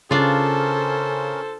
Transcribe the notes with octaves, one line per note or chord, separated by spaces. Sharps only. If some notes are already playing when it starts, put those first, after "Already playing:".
C#3 C#4 D4 F4 A4 A#4 C5